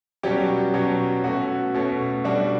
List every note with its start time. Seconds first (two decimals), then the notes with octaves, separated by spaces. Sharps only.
0.23 B2 F#3 G3 C#4 G4
0.74 B2 F#3 C#4
1.24 B2 A3 C#4 F#4
1.75 B2 A3 C#4
2.24 B2 G3 D4 F#4